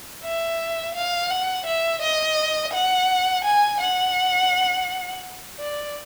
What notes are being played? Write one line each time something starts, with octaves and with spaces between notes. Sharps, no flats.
E5
F5
F#5
E5
D#5
F#5
G#5
F#5
D5